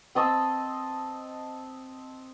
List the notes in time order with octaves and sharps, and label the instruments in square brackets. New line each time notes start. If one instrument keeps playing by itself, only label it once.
[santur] C4 D#5 A5 E6